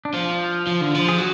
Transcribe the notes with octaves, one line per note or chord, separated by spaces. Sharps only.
D4
F3 F4
F3
D3
F3
G#4
F#3 F#4